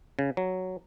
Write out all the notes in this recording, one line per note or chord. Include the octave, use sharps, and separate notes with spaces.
C#3
F#3